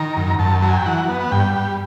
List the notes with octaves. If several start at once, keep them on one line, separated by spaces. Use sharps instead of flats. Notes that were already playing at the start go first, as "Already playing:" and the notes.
Already playing: D#3 A#5
F#2
F#2 A5
F#3 A5
G#5
G5
E3 F#5
B3
F#5
G2 G5
G3